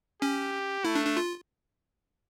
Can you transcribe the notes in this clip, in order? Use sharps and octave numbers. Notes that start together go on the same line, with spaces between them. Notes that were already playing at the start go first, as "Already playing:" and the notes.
C#4 G4
A3 E4
D4
D4
F4